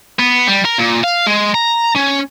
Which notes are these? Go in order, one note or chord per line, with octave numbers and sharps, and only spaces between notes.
B3
G3
A#4
A#2
F5
G#3
A#5
C#4